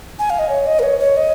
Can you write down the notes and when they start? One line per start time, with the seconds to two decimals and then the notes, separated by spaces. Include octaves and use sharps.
0.19 G#5
0.30 F5
0.39 D#5
0.49 C#5
0.66 D#5
0.79 A#4
0.83 C#5
1.00 C#5
1.17 D#5